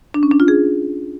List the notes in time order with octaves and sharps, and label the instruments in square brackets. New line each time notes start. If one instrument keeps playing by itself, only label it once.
[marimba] D4
C#4
D4
F4
G#4